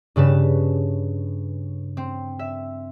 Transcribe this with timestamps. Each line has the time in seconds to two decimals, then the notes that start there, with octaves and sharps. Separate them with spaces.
0.16 G2 C#3 B4 A5
1.97 C4
2.39 E5